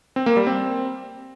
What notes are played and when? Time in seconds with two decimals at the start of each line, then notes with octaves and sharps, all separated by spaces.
0.16 C4
0.26 A#3
0.36 G3
0.47 C4